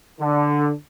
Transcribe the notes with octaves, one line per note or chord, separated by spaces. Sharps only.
D3